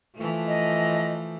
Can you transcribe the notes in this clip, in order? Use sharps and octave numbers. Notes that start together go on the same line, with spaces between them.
E3 F3 A3
D#5